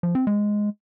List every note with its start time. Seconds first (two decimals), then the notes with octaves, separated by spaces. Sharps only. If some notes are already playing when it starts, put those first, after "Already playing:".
0.03 F3
0.15 C4
0.27 G#3